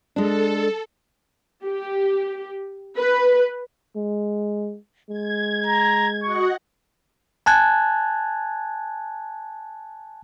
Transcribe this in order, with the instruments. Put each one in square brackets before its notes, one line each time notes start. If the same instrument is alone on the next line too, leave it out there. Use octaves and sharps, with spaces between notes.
[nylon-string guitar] G#3 D4 [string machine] A4
[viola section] G4
B4
[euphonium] G#3
[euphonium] G#3 [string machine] G#6
[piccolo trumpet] A#5
[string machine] F#4 D#5 F#5 [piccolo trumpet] C#6
[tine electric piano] G#5 A5 F#6 G#6